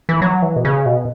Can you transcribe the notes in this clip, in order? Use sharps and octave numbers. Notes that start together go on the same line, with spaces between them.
E3
F#3
E3
B2
C#3
B2